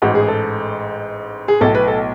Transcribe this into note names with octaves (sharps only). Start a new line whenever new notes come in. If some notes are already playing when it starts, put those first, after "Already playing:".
A1 G#2 F#4
G#4
A4
G#4
B1 A2 A4
B4
A4